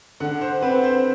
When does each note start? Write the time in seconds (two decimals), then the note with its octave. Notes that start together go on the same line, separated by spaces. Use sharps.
0.20 D3 F#5
0.41 C5
0.62 C4 B4
0.84 C5